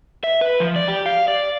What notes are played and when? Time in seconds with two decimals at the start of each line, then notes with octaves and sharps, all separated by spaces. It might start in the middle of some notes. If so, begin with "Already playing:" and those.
0.24 E5
0.41 B4
0.60 F3
0.76 D5
0.88 G4
1.06 F5
1.28 D5